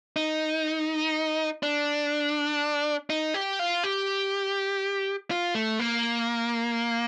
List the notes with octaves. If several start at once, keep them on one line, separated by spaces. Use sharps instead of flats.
D#4
D4
D#4
G4
F4
G4
F4
A3
A#3